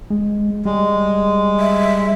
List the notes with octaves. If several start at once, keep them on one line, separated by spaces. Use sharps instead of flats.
G#3
G3 G#3
E5